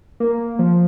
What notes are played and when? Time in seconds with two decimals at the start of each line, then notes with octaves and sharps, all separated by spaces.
0.20 A#3
0.59 F3